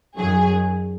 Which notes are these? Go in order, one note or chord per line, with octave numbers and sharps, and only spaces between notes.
F#2 D#3 F#3 G#4